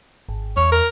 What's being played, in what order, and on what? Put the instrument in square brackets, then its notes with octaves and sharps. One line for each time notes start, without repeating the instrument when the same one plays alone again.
[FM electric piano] G#1
[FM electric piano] E2 [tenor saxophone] C#5
[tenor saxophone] A#4